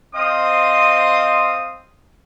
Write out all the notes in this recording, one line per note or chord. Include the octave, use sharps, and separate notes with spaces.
C4 C5 D#5 F5 D#6